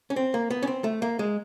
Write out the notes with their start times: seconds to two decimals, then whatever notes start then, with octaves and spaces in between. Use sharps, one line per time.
0.10 C#4
0.16 C4
0.34 A#3
0.51 B3
0.63 C#4
0.67 C4
0.84 A3
1.02 A#3
1.19 G#3